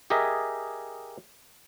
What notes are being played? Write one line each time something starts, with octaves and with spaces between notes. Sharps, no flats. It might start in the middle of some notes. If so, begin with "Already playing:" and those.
G4 G#4 A#4 D#5 E5 G#5